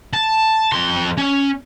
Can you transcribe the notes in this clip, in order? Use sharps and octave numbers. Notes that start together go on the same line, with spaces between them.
A5
F2 C6
C#4